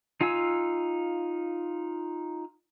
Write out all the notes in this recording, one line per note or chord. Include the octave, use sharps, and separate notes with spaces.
D#4 F4 F5 G#5 E6